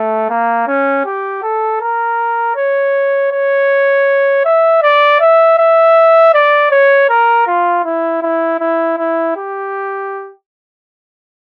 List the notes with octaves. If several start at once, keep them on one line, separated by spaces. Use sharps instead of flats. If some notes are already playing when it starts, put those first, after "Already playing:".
Already playing: A3
A#3
C#4
G4
A4
A#4
C#5
C#5
E5
D5
E5
E5
D5
C#5
A#4
F4
E4
E4
E4
E4
G4